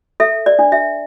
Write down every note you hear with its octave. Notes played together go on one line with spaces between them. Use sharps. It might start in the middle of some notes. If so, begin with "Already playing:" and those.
A4 E5
D5
D4
E5